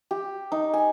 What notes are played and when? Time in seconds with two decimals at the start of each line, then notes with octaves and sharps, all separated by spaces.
0.11 G4
0.52 D#4
0.74 G#5